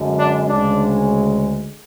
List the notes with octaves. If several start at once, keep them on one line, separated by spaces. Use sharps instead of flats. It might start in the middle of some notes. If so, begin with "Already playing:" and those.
Already playing: F#2 D3 G#3
D4
D2 C#3 G#3 D4